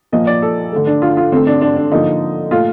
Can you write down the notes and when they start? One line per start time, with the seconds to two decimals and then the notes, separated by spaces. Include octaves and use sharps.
0.12 A#2 F3 A#3 D#5
0.27 D5
0.42 A4
0.72 D3 A3
0.87 D4
1.02 F4
1.17 F4
1.32 D3 A3 C4
1.47 D4
1.61 D4
1.77 D4
1.91 D3 F3 A#3 D#4
2.51 A#2 A3 F4